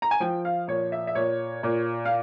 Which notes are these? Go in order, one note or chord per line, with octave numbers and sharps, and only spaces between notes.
A#5
G#5
F3 G5
F5
A#2 C#5
E5
E5
A#2 C#5
A#2
F5